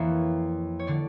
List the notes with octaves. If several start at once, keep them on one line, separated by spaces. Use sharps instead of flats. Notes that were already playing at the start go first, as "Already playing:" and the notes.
Already playing: F2 E3 A#3 C#5
C#5
D3 D5